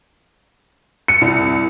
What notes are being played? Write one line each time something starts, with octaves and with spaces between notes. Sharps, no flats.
C#7
C2